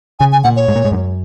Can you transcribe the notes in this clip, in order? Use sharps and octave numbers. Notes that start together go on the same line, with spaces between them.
C#3 G#5
G#5
A#2 F#5
C#5
G#2
A#2
G#2
F#2